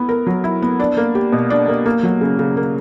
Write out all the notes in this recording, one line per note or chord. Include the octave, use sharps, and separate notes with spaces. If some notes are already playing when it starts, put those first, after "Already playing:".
Already playing: B3 E4
A#4
F#3
E4
B3
D4
A#3
G4
B2
D4
A#3
A#3
F#3
C#3
C#3
A#3